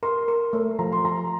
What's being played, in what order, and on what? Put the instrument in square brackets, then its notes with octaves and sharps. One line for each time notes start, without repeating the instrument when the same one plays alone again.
[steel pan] A#4 [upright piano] C6
[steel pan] A#4
A3
[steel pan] F3 [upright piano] A#5
[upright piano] C6
[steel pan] F3 [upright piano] A#5